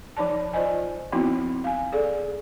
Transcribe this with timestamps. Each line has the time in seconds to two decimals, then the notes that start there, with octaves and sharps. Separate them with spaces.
0.17 F3 D#4 D5 A5
0.53 F4 C5 D5 D#5 G#5
1.12 F3 B3 C4 D#4 E4 F#4
1.64 F5 G#5
1.93 G#4 A4 D5